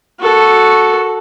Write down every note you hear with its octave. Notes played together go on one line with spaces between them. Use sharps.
F#4 A4